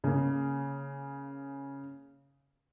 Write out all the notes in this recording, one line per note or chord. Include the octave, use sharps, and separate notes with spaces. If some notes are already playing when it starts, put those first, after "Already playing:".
C#3 A#3